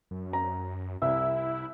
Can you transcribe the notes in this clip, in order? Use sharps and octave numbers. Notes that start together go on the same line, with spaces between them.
F#2
A#5
C2 E4 E5